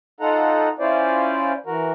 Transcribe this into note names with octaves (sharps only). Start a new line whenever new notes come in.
D#4 F4 A4 F#5 A#5
C#4 E4 F4 C5 D5
E3 F#4 A#4